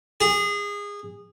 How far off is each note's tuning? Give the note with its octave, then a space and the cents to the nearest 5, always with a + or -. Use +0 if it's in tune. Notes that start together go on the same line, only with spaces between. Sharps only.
G#4 -25